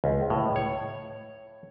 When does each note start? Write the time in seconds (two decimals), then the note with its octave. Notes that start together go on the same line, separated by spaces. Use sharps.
0.04 C#2
0.30 A2
0.56 C#5